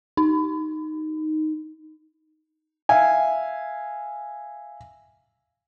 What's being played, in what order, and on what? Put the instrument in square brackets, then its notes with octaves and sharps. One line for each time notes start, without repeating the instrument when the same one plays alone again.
[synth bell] D#4
[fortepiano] E5 F5 G#5